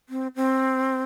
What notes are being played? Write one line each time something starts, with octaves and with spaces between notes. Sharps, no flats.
C4
C4